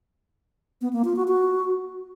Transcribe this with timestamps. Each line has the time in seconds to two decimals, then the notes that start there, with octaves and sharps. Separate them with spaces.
0.81 B3
0.93 A#3
1.04 F4
1.16 F#4
1.28 F#4